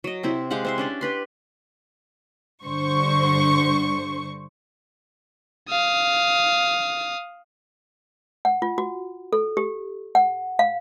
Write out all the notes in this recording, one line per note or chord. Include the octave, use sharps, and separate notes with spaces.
F#3 D#5
C3 C4 E4
G#3 G4 F5 F#5
C4 E5 C6
C#4 D4 D5
G4 B4 C6
G2 D3 C5 C#6
F5 D#6
F#5
F4
F#4
A4
G4
F#5
F5